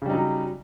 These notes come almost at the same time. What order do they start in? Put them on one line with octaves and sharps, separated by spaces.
C#3 G3 D#4 F#3